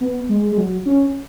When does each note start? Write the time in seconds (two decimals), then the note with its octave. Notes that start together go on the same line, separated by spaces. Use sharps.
0.01 B3
0.29 G#3
0.52 G#3
0.58 F#3
0.86 C#4